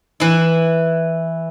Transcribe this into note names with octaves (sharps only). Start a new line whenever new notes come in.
E3 E4